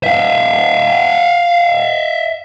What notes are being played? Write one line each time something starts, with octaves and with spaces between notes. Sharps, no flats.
E5 F5